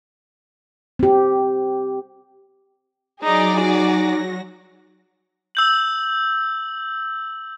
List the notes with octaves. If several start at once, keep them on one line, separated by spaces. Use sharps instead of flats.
C4 G4
F#3 D#4 G#4 D5 A#6
D#4 F#4
E6 G6 F#7